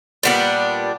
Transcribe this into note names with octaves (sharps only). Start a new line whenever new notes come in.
A#2 G3 B3 D4